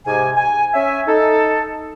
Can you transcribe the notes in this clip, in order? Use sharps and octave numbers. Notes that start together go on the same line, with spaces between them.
G#2 C3 G#5
G#5
C#4 E5 G#5
D#4 A4